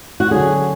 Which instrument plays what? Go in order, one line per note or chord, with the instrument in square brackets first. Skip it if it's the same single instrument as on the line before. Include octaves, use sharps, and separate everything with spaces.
[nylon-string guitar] F#4
[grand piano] D3 F#3 C#4 F#4 [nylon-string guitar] G#4